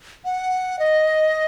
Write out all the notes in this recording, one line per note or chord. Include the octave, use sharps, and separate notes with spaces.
F#5
D#5